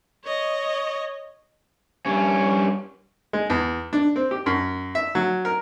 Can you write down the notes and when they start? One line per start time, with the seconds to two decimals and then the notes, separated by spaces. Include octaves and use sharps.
0.24 C#5 D#5
2.06 G2 C#4
3.33 G#3
3.50 E2
3.93 D4
4.16 C4
4.31 G4
4.46 F#2
4.95 E5
5.15 F#3
5.45 A#4